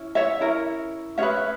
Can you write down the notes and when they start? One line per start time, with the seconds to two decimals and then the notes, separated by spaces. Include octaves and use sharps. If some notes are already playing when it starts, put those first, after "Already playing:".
Already playing: C#4 E4
0.15 C#5 E5
0.41 C#4 E4 A#4
1.17 C#4 G#4 B4 C#5 E5